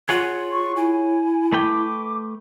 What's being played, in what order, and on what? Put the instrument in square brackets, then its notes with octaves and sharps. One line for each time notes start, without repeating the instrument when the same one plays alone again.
[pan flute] F4 [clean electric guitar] G#4 C#5 F#5
[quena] C#6
[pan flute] E4 [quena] G#5
[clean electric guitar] A3 B4 G5 [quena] D6